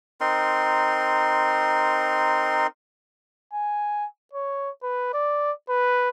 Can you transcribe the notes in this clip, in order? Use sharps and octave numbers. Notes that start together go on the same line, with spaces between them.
C4 D#4 A#4 C6
G#5
C#5
B4
D5
B4